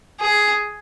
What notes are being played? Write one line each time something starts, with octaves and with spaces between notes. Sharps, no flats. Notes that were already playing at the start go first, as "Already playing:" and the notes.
G#4